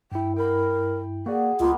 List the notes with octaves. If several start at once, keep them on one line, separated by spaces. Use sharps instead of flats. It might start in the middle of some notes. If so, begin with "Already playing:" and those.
G2 E4 G5
A#4 G5 B5
A#3 F#4 G#4 D5
C#2 G#3 A#3 B3 F4